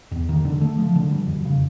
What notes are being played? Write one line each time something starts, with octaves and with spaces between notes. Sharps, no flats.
E2
D#3
D3
A3
F3
D3
G3
F2
C#3